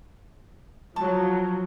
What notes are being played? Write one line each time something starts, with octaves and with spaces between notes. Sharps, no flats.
F3 F#3 A5 C#6